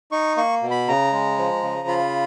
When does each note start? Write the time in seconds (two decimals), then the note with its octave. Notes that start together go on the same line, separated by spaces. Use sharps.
0.12 D#4 C#6
0.37 A#3 C#6
0.62 B2
0.71 B5
0.88 C#3 A#5
1.12 G#3
1.38 F3
1.63 C#3
1.88 F4 B5